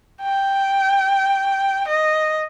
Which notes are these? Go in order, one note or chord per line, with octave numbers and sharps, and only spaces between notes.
G5
D#5